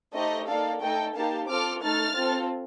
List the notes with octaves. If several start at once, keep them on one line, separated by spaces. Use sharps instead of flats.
A3 D#4 G4 C5 D#5
A#3 D#4 A4 D5 F5
A3 D#4 A4 D#5 G5
A#3 D#4 G4 F5 A5
C4 F4 A4 D6 F6
A3 D#4 A4 F6 A6
C4 F4 A4